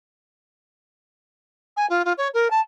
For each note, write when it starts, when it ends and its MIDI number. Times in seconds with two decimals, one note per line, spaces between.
1.77 1.86 80
1.90 2.05 65
2.05 2.13 65
2.18 2.28 73
2.34 2.50 70
2.50 2.60 81